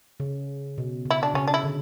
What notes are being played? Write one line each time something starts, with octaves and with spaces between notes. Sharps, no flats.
C#3
B2
C#3 E4
D4
C#3 C#4
D4
E4
D3